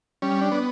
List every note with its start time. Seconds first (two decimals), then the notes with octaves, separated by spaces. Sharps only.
0.22 G3 C#4
0.41 D4
0.51 B3